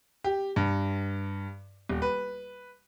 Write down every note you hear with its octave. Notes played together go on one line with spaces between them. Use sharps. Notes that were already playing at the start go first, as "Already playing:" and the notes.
G4
G2
D#1
B4